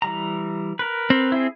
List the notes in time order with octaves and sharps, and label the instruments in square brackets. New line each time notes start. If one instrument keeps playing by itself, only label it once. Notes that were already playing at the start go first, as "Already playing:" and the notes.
[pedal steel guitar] E3 G3 A#5
A#4 B4
[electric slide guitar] C4
[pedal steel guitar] E4 G#4